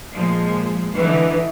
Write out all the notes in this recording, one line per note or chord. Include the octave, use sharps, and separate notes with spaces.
A#2 F3 G#3
D3 E3 D#4 B4